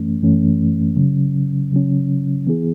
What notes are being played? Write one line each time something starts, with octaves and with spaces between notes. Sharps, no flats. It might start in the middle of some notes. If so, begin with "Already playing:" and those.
Already playing: F#2 E3 A3 C#4
F#2 E3 A3 C#4
C#3 F#3 C#4
C#3 F#3 C#4
E3 B3 E4 G#4